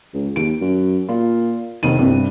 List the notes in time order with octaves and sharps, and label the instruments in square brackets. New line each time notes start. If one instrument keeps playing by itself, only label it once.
[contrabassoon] C#2
[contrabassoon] D#2 [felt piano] D7
[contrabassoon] F#2
[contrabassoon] A#2 [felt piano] F4
[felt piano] F1 D#7 [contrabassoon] D#3
[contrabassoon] C2 [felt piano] G2 C3